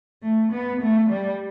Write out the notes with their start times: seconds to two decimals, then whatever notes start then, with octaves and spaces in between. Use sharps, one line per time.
0.23 A3
0.52 B3
0.81 A3
1.10 G3